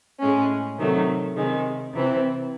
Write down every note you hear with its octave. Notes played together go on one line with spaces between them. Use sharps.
A2 G#3 C#4
C3 D#3 F#3 A3
C3 D#3 G#3
C3 E3 C4 E4